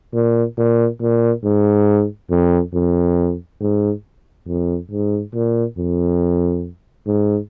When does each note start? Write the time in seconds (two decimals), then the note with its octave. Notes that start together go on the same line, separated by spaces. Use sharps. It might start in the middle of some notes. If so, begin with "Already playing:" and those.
0.14 A#2
0.57 A#2
1.01 A#2
1.44 G#2
2.30 F2
2.74 F2
3.61 G#2
4.47 F2
4.91 G#2
5.34 A#2
5.78 F2
7.07 G#2